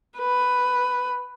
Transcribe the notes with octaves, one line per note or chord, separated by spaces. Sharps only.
B4